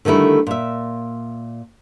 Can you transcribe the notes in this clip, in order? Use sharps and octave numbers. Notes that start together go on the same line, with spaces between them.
D3 D#3 G3 A3 E4
A#2 E5